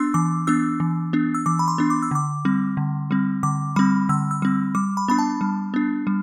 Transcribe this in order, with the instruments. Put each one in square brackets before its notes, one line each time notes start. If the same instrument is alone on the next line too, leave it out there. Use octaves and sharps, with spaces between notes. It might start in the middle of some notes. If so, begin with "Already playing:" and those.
Already playing: [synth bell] B3 D4 C6 E6
E3 D6
B3 D4 E6
E3
B3 D4
E6
E3 D6
B5
C6
B3 D4
D6
E6
D3 D6
G3 C4
D3
G3 C4
D3 D6
G3 C4 B5
D3 E6
E6
G3 C4
G3 D6
B5
B3 D4 B5
A5
G3
B3 D4
G3